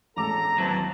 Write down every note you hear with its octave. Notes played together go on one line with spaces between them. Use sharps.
E1 A1 A4 A#5 D6
D#2 E3 F#3 C4 A5